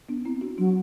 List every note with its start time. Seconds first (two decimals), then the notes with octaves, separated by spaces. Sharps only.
0.09 B3 D4
0.25 C4 E4
0.41 D4 F#4
0.58 F#3 D4 F#4